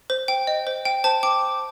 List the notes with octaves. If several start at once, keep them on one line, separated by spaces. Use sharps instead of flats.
C5
G5
D#5
C5
G5
C5 A5
G5 D6